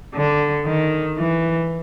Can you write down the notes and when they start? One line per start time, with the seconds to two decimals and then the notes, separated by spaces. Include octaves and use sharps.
0.14 D3
0.66 D#3
1.18 E3